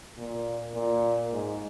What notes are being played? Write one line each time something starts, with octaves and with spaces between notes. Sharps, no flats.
A#2
A#2
G#2